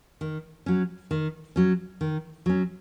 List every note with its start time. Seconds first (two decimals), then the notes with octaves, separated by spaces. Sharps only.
0.21 D#3
0.66 F#3 C#4
1.11 D#3
1.56 F#3 C#4
2.01 D#3
2.46 F#3 C#4